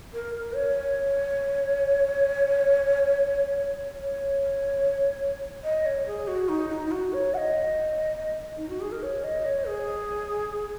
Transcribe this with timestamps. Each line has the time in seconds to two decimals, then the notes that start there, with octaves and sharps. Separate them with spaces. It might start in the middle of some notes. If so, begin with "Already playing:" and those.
0.14 A#4
0.35 A#4
0.55 C#5
3.95 C#5
5.64 D#5
5.86 C#5
6.07 G#4
6.28 F#4
6.49 D#4
6.70 D#4
6.86 D#4
6.91 F#4
7.13 C#5
7.34 F#5
7.37 D#5
8.57 D#4
8.69 F#4
8.81 G#4
8.92 A#4
9.03 C#5
9.24 D#5
9.45 C#5
9.67 G#4